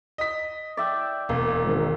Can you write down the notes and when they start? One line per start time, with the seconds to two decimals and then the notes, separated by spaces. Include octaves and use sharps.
0.18 D#5 B6
0.77 D5 E5 G5
1.29 E1 A#3
1.64 G#1